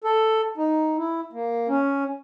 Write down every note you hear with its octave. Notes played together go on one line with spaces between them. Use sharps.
A4
D#4
E4
A#3
C#4